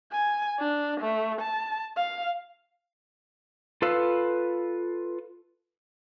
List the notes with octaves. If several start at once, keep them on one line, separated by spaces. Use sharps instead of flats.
G#5
D4
A3
A5
F5
F4 A4 B4 F5 E6